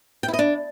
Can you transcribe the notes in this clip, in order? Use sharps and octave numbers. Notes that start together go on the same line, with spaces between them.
G5
E4
D#5
D4